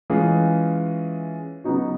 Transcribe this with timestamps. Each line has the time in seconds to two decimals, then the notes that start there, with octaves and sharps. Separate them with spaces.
0.10 E3 G#3 C#4 F4 G#4
1.64 C#3 F#3 B3 D#4 F#4